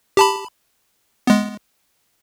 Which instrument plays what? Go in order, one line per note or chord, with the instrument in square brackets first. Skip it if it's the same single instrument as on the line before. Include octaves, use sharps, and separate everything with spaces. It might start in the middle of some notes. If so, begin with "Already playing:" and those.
[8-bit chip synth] G4 A5 B5
G#3 B3